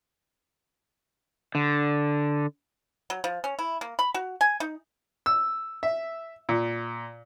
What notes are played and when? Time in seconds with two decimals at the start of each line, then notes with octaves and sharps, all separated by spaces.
1.55 D3
3.10 F#3
3.24 F3
3.44 C#4
3.59 E4
3.81 A#3
3.99 B5
4.14 F#4
4.41 G#5
4.60 D#4
5.26 E6
5.83 E5
6.49 A#2